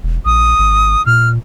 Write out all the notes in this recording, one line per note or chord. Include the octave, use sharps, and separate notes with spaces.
E1
A#1 D#6
G#1
A#2 F6